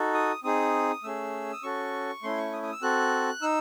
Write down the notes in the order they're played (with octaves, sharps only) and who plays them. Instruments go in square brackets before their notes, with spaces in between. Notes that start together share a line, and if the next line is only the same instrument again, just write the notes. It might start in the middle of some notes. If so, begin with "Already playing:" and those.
Already playing: [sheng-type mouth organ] D#4 F#4 A4
D#6
C4 D#4 G#4 D#6
A3 C#4 G#4 E6
D#6
C#4 F#4 A4 C#6
A3 C#4 E4 C6
C#6
D#6
D#6
E6
C4 F#4 A4 F#6
D#4 E6